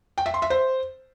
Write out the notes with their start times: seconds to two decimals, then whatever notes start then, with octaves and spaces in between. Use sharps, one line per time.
0.18 G5
0.26 E5
0.34 C6
0.42 E5
0.50 C5